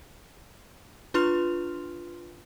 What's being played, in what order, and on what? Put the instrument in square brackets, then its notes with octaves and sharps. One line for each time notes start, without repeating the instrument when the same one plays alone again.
[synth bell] D4 F4 B4 C6 F6 F7